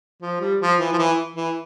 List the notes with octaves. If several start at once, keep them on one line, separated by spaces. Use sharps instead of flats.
F3
G3
F3
E3
F3
E3
E3